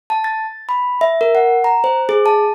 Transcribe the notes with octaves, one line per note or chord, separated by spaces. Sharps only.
A5
A6
B5
E5
A#4
F#5
A#5
C5
G#4
A5